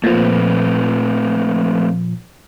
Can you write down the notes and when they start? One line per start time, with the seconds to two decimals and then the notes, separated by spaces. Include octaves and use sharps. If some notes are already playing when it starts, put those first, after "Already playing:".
0.04 A#2 F3 A3 C4 B4